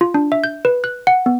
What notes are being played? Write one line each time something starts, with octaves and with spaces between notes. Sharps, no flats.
F4
D4
E5
G6
B4
F#6
F#5
B3